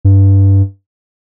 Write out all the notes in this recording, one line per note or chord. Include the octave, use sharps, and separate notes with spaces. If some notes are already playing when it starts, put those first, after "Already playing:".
G2